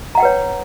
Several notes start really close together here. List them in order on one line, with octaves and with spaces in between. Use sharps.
A#5 F#5 G5 B4 C#5